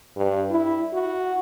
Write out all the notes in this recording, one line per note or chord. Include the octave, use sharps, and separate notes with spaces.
G2
E4
F#4